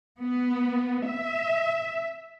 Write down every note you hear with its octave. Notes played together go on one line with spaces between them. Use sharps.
B3
E5